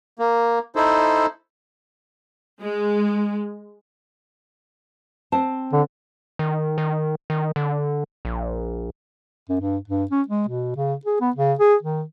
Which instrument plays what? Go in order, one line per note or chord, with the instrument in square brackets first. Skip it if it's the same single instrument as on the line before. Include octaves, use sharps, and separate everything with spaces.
[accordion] A#3
D#4 E4 A4 C5
[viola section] G#3
[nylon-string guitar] C4 C5 A5
[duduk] D3
[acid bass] D#3
D#3
D#3
D3
A#1
[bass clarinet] F#2
G2
G2
C#4
G#3
B2
C#3
G#4
B3
C#3
G#4
D#3